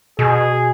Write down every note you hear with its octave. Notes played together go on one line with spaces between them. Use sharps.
B2 G#4